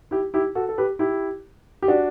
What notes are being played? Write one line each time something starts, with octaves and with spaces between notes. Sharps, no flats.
E4 G4
E4 G4
F#4 A4
A4
G4 B4
E4 G4
G4
D4 F#4